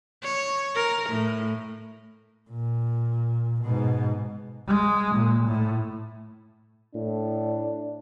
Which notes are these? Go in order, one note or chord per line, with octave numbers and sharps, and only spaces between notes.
C#5
A#4
A2
A#2
G#2 B2
G#3
A#2
A2
A2 D4